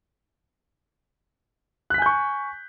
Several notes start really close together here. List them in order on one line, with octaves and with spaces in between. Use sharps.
F#6 B6 G#5 G6 C#6